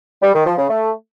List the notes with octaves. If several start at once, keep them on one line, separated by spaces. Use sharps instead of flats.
G3
D#3
F3
C#3
A3